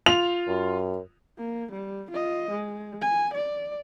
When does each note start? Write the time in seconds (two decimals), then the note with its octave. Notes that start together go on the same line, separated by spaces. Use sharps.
0.06 F4 F7
0.48 F#2
1.38 A#3
1.72 G3
2.11 F4 D#5
2.51 G#3
3.02 G#5
3.34 D5